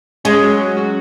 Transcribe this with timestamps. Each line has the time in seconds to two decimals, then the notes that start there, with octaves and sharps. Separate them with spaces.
0.25 G#3 C#4
0.43 F#3
0.59 F#3
0.77 F#4